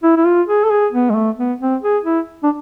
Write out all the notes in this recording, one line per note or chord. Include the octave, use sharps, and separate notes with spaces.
E4
E4
F4
G#4
A4
G#4
B3
G#3
A3
B3
C4
G#4
E4
D4